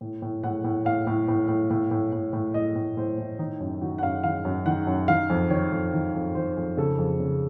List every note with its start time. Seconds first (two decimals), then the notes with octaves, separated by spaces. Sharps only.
0.01 A2
0.22 A2
0.43 A2 F#5
0.64 A2
0.85 A2 F5
1.07 A2
1.28 A2
1.48 A2
1.70 A2
1.91 A2
2.12 A2
2.33 A2
2.54 A2 D#5
2.75 A2
2.97 A2 C5
3.18 A2
3.39 D#3 D#4
3.60 F#2
3.81 D#3 F#4
3.98 F#5
4.02 F#2 F5
4.24 D#3 F5
4.45 F#2
4.66 D#3 F#5
4.87 F#2
5.08 D#3 F5
5.30 F2
5.50 D#3 C#5
5.72 F2
5.94 D#3
6.15 F2
6.35 D#3 C5
6.57 F2
6.77 C#3 A4
6.98 F2
7.20 C#3